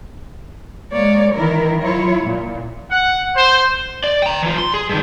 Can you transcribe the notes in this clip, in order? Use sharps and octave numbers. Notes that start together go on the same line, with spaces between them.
G#3 A#3 C#5 D5
D#3 E3 E4 A#4
F#3 E4 F4 C#5
A#2
F#5
C5
D5
G5 A#5
E3 F4
C6
G#4
G2 D#3